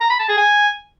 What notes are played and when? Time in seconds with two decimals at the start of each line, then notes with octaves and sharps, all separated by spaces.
0.01 A#5
0.10 B5
0.19 A5
0.28 G#4
0.37 G#5